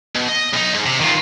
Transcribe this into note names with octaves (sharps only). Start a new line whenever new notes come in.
B2
D#5
B1 D#4
G#2
C3
D#3 F4